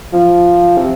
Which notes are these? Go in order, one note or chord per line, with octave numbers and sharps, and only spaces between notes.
F3
C3